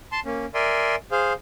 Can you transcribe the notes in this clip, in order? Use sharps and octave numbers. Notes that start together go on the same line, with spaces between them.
A5 C6
A#3 C#4
A#4 D5 E5 G#5 C6
G#4 C5 F5